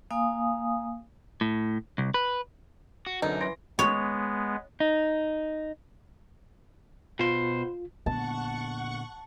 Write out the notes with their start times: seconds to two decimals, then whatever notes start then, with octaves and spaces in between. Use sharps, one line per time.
0.11 A#3 F5 G#5 D#6
1.41 A2
1.98 C2
2.14 B4
3.06 F#4
3.22 F#2 B2 D3 D#4
3.41 E3 C6 A#6 D7
3.79 G#3 B3 C#5
4.80 D#4
7.19 B2 F4 C5
8.06 A#2 D3 B3 F#5 A5 C#6